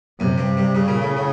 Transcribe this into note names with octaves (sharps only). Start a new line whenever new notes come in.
F#2 C3
G2
G2
G2 C#3
A#2
A2
A2